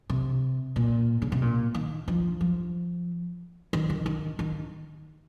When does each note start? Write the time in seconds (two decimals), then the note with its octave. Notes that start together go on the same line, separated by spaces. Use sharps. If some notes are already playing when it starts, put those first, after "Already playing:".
0.10 C3
0.76 A#2
1.22 C#3
1.32 C3
1.42 A#2
1.74 D#3
2.08 F3
2.41 F3
3.73 D#3
3.90 D#3
4.06 D#3
4.39 D#3